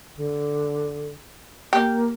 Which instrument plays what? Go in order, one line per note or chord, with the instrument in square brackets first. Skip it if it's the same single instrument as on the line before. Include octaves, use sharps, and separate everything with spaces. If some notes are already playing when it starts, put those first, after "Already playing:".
[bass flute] D3
[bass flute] A#3 [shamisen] G4